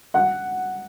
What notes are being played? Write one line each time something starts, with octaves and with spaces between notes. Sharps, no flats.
F#5